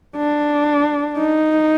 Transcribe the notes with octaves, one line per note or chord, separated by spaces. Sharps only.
D4
D#4